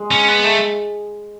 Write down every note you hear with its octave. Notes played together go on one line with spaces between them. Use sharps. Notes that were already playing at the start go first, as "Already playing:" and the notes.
Already playing: G#3
C#4
B3
A3